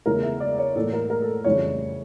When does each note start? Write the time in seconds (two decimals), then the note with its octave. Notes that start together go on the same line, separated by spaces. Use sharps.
0.06 E2 C#3 E3 A3 A#4
0.23 E5
0.40 D5
0.58 C#5
0.76 A2 E3 A#3 A4
0.93 A#4
1.10 A#4
1.22 A4
1.44 F2 C#3 E3 G3 C#4 C#5